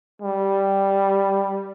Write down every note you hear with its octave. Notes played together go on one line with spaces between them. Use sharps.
G3